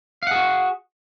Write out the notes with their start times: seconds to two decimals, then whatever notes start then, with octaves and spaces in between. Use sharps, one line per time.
0.23 F5
0.27 F#5
0.31 G#4
0.36 F#4